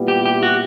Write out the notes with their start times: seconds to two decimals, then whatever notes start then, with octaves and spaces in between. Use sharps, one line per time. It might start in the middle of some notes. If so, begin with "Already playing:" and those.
Already playing: A#2 G3 B3 E4
0.08 G4
0.26 G4
0.43 F#4